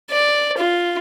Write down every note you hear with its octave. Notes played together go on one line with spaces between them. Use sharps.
D5
F4